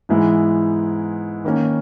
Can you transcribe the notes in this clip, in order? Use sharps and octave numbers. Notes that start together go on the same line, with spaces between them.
G#2 E3 G#3 B3 E4
D#3 A#3 C#4